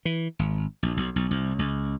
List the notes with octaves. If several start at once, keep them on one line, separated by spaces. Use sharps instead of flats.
E3
G#1
A#1
B1
B1
C2
C#2